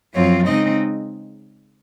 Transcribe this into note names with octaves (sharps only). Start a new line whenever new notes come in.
F#2 F3 C4 F4 C#5
C#3 G#3 C4 D#4 D#5